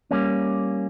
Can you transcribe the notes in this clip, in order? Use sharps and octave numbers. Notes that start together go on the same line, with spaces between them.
G3 A#3 C#4